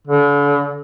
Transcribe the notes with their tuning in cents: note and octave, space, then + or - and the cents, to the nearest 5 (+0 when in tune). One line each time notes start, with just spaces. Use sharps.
D3 -40